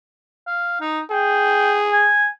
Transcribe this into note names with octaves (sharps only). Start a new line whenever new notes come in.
F5
D#4
G#4 G5
G#5